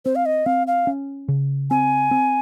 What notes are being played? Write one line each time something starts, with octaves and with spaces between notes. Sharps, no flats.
C4 C5
F5
D#5
C4 F5
F5
C#4
C#3
C4 G#5
C4